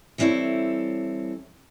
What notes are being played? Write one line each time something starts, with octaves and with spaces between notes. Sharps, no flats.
E3 G3 C4 E4 A4 C#5